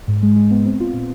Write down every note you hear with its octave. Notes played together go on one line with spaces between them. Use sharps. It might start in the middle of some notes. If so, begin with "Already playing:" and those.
G#2
G#3
G#3
B3
C4
F4
A#2